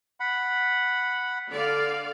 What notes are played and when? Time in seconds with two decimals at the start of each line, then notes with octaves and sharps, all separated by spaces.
0.20 F#5 B5
1.50 D3 D5 F5